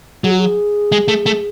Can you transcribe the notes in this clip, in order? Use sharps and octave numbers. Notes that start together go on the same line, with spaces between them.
F#3 G#4
F#4
G#4
G#3
A3
A3